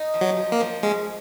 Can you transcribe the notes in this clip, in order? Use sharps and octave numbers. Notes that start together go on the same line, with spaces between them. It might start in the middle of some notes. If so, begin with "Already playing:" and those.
Already playing: D#4
F3
F#3
F3
A#3
F3
G#3 C#4